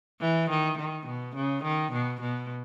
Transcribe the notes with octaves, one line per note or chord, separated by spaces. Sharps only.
E3
D#3
D#3
B2
C#3
D#3
B2
B2